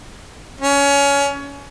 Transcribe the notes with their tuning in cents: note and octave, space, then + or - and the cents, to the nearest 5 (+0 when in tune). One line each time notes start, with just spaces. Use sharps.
C#4 +25